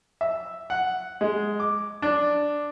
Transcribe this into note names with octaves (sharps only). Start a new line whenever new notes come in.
E5
F#5
G#3
D6
D4